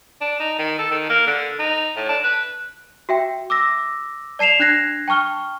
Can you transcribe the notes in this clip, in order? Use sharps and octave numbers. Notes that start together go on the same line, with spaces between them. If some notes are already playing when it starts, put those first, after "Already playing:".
D4
D#4
D#3
A4
D#3
A#3
D3
D#4
A2
D4
B4
F#4 E5 G5
D6 E6 A#6
D5 A5 C7 E7 F7
D4 F#6 G#6 A#6 C7
G5 A5 C#6 F6 G7